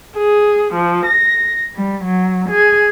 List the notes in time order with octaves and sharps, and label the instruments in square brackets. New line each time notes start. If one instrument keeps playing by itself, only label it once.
[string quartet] G#4
F3
A#6
G3
F#3
G#4